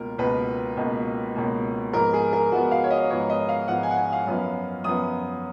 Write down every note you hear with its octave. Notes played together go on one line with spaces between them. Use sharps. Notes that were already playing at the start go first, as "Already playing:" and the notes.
Already playing: C#2 B2 A#3 A#4
C#2 B2 A#3 B4
C#2 B2 A#3
C#2 B2 A#3
G#2 F3 B3 A#4
G#4
A#4
G#2 F3 B3 F#4
F5
C#5
D#5
G#2 F3 B3 C#5
D#5
F5
G#2 F3 B3 F#5
G#5
F#5
G#5
F5
F#2 F3 B3
F#2 F3 B3 D#6